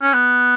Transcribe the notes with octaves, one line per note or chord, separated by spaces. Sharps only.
C#4
B3